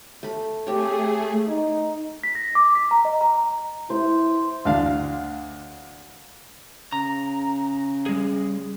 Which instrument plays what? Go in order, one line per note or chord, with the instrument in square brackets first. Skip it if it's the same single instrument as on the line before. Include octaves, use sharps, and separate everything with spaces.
[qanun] A3 B5
[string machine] A3 G#4 [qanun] C4 G4 C#5
[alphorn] D#4
[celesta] B6
A#6
D6
B6
A#5
D#5
A#5
[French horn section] E4 [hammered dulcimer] C5
[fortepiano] D2 D4 F5
[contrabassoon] C#3 [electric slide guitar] A#5
[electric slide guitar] G3 G#4